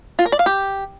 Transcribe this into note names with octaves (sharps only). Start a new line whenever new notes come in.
F4
A#4
D5
F5
G4